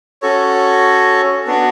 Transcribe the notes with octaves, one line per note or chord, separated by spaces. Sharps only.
C#4 F#4 A4 C#5
B3 D4 F#4